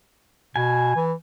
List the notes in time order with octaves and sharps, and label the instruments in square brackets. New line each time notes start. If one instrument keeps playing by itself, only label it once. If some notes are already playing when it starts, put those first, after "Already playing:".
[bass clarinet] B2 [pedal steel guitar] G#5
[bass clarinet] E3